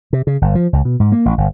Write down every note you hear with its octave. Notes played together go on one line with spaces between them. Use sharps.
C3
C#3
G1
F3
C#2
B2
G#2
A#3
A1
G1